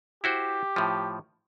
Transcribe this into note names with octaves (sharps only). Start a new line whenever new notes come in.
E4 F#4 G4 C5
A2 F3